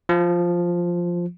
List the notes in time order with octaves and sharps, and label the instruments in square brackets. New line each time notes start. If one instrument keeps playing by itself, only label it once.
[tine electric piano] F3